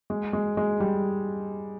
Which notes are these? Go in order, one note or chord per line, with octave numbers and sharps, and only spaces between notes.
G#3
G#3
G#3
G3